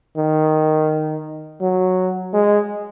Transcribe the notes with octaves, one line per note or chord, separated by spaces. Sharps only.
D#3
F#3
G#3